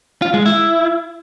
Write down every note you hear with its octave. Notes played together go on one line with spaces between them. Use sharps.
F4
G#3
E4